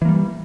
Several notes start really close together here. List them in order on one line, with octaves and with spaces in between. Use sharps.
E3 A#3 G3